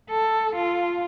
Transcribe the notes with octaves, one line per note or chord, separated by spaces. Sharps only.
A4
F4